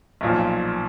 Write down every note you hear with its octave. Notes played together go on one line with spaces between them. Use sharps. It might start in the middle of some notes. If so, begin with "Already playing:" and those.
B1 A#2 F3